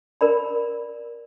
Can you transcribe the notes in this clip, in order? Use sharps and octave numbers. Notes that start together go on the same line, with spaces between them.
A#4 D5 B5